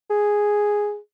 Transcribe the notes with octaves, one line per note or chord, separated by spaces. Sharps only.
G#4